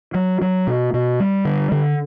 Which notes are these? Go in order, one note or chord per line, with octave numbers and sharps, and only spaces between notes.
F#3
F#3
B2
B2
G3
D3
D3